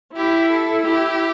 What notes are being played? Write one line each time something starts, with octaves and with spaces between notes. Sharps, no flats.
E4 G4
A4
E4 G4